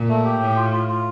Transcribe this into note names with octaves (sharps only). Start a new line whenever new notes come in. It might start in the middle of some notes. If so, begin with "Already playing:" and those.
Already playing: A#2
A3
G4
A2 G5
F4
F4
F4